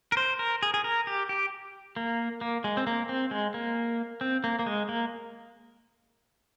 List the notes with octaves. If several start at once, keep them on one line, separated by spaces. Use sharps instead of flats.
A#4
C5
A#4
G#4
G#4
A#4
G4
G4
A#3
A#3
G#3
C4
A#3
C4
G#3
A#3
C4
A#3
A#3
G#3
A#3